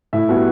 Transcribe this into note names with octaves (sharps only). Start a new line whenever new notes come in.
A2 E4 E5
G3 B3 F#4 F#5